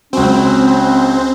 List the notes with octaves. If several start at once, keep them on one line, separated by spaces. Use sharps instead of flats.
C#2 F#3 C4 C#4